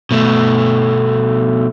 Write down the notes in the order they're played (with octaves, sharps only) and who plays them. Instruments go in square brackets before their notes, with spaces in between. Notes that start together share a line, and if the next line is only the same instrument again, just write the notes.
[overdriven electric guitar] B2 A3